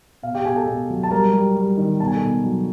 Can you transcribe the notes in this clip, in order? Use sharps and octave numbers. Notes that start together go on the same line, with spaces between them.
B2 F5
G4 G5
B2 G#4 G#5
A4 A5
B2
F#3
A5
G3 A#4 A#5
G3
G3
D#3
B2 A5
G#5
A4 A5
B2
F#3